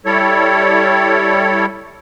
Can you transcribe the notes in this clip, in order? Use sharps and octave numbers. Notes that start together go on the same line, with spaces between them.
G3 E4 A4 C#5